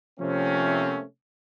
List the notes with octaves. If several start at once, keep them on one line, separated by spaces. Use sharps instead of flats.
C3 F3 A3 A#3 C4 C#4